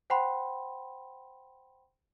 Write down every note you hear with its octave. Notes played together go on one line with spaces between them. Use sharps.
C5 F#5 G5 A5 B5 C6